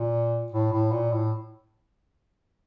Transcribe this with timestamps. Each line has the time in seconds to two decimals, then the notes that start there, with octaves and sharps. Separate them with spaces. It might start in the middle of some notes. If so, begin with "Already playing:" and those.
Already playing: A#2
0.52 A2
0.72 A2
0.92 A#2
1.12 A2